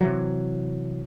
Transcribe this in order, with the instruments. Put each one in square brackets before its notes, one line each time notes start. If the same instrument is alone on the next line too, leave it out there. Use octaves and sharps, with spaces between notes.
[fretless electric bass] C3 E3 F#3